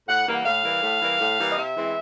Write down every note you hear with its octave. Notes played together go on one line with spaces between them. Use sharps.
A2 F#5
E3 G3 A#3
F#5
A2 F5
E3 G3 A#3
A2
E3 G3 A#3
A2
E3 G3 A#3
D#5
C3 E5
E3 G#3 C4 E4